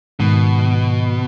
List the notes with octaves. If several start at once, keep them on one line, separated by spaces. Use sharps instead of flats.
G#2 B2 D#3